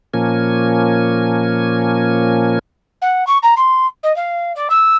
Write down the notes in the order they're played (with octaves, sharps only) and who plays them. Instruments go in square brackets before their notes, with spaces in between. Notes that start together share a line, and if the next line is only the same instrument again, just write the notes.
[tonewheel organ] A#2 F3 A#3 C#4 G#5
[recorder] F#5
C#6
A#5
C6
D#5
F5
D5
E6